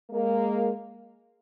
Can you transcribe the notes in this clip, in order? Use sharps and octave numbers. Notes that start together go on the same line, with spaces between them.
G#3 A#3